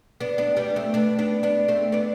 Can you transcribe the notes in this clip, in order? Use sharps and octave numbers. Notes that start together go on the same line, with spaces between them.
B3 D4
B3 D4
G3 B3
A3 C4
B3 D4
B3 D4
B3 D4
A3 C4
B3 D4